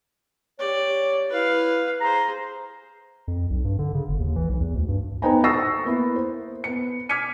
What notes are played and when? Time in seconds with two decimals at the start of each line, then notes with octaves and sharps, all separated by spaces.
0.59 G4 C#5 D5
1.30 E4 B4 F5
2.01 G#4 C5 A#5
3.28 F2
3.50 B1
3.65 G2
3.79 D3
3.94 C#3
4.08 G1
4.20 D#2
4.36 E3
4.49 B1
4.61 E2
4.75 D2
4.88 G2
5.22 B3 D#4 C5 G5 G#5 A#5
5.44 C#6 D#6 E6 A6 A#6 C7
5.85 A#3 B3 E4
6.16 C5
6.64 B3 C#7
7.09 D6 F6 G#6 B6 C#7 D#7